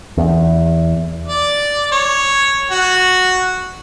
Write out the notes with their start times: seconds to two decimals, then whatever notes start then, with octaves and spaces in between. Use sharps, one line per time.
0.17 E2
1.28 D5
1.92 C#5
2.71 F#4